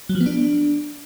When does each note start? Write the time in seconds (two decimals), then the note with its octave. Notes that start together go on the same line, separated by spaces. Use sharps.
0.09 F#3
0.15 F3
0.21 B3
0.26 D4